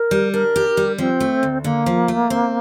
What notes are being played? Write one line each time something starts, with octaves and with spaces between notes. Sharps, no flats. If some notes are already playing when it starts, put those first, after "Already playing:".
Already playing: A#4
G3
D4 A#4
G4
G3
F3 C4
A3
D2
D3 A#3
F3
A3
C4